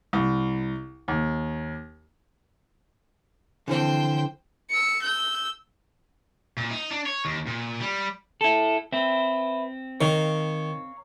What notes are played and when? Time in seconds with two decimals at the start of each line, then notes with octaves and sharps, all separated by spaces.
0.13 C2
1.08 D#2
3.68 D3 E3 F3 C4 C5 G5
4.70 E6 C#7
5.02 E6 G6
6.57 A#2
6.71 D#4
6.91 D4
7.06 C#5
7.25 D#2
7.47 A#2
7.80 G3
8.41 E4 A4
8.93 C4 B4 E5
10.01 D#3 C#5 F5 A#5